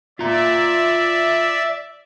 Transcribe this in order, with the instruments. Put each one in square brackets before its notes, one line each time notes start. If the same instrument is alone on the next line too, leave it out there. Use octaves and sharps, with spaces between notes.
[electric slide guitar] F4 A#5 [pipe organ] D5 E5